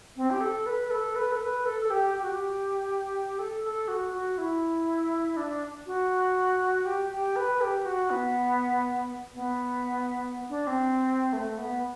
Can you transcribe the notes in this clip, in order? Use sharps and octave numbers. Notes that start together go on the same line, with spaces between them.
C4
G4
A4
B4
A4
B4
A4
B4
A4
A4
G4
G4
F#4
G4
A4
A4
F#4
F#4
E4
D4
F#4
G4
G4
B4
G4
F#4
B3
B3
D4
C4
A3
B3